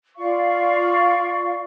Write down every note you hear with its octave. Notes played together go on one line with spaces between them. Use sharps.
F4 D5 F5 C#6